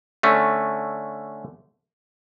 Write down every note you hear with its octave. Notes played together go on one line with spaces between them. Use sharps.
D3 A3 C#4